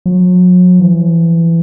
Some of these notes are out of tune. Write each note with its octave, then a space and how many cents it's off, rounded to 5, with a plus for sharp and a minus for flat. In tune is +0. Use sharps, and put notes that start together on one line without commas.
F#3 -40
E3 +20